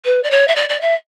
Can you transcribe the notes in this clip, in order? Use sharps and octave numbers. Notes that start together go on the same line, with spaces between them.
B4
D5
C#5
E5
D5
D5
E5